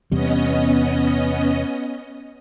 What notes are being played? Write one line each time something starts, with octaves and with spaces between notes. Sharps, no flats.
E2 C3 G3 B3 C#4 D#5